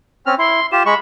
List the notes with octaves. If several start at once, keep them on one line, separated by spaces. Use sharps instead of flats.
C4 C#4 F6
E4 C6
F4 G4 E7
G#3 B5 C#6